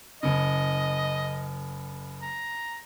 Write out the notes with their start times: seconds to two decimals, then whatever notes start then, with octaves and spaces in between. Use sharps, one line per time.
0.23 F#1 C#3 D#5
2.22 A#5